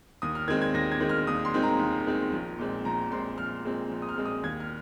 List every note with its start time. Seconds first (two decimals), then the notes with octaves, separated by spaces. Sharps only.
0.22 D#2 D#6
0.35 F6
0.48 D#3 G#3 C4 G#6
0.61 G#6
0.74 D#2 A#6
0.92 G#6
1.00 D#3 G#3 C4
1.09 F6
1.27 D#2 D#6
1.45 C6
1.54 D#3 G#3 C4
1.63 A#5
1.79 D#2
2.07 D#3 G#3 C4
2.32 A#1
2.59 A#2 G#3 C4
2.85 A#1 A#5
3.11 A#2 G#3 C4 C6
3.38 A#1 F6
3.65 A#2 G#3 C4
3.91 A#1
4.02 D#6
4.09 F6
4.16 A#2 G#3 C4
4.25 D#6
4.43 D#2 G#6
4.60 F6